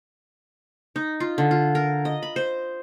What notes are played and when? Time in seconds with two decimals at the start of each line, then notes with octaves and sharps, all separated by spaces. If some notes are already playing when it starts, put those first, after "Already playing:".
0.96 D#4
1.20 F4
1.38 D3
1.51 F4
1.75 A#4
2.05 D#5
2.23 B5
2.36 C5